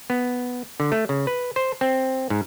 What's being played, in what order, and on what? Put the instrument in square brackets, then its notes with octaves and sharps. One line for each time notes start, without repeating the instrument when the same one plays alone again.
[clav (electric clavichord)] B3
D3
A3
C#3
B4
C5
C4
G#2